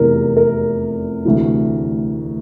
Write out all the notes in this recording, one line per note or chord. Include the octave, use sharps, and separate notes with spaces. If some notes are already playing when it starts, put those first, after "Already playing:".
Already playing: F1 E2 C3 E3 A#4
A#4
D2 C3 E3